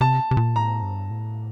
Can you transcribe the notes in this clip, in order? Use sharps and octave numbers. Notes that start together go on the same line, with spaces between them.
C3 A5
C3
A#2
A2 A#5
G2
A2